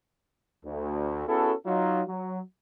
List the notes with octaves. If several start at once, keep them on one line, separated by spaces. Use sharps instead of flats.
D2
B3 C#4 E4 F#4 G#4 A4
F#3 D#4 F4
F#3